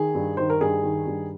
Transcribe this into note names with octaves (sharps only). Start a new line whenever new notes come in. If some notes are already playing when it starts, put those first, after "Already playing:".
Already playing: D#3 G#4
G2
D#3 C5
A#4
G2 G#4
D#3
G2